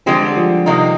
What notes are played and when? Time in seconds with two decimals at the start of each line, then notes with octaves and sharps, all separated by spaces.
0.06 D3 F3 G#3 C4 G4
0.22 G3
0.37 F3
0.66 C3 D#3 A#3 D#4